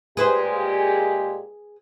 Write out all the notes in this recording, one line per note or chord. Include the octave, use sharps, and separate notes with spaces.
A#2 G#3 G4 G#4 B4 C5